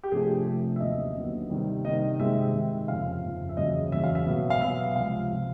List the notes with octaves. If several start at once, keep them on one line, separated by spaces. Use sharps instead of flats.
G4
C3 F3 A3 D4 G#4
C3 F3 A3 D4 A4
E5
D#2 D3 F#3 B3 D#5
D#2 D3 F#3 B3
C3 D#3 G3
C3 D#3 G3 D#5
C3 D#3 G#3 C4 D#4 E5
C3 D#3 G#3 C4 D#4
F2 C#3 F3 F5
F2 C#3 F3
E5
E2 C#3 F#3 D#5
E2 C#3 F#3 E5
F5
E5
B2 F#3 B3
F5
B2 F#3 B3 E5
C#2 C3 F3 F5
C3 F3